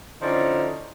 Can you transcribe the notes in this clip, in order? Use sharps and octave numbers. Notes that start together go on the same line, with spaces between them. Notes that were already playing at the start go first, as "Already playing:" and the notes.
D3 F3 C#4 D#4 E4 D5